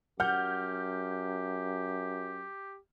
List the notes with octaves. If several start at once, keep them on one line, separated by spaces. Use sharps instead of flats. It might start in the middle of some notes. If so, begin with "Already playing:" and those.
F#2 G4 F#5 F6 G6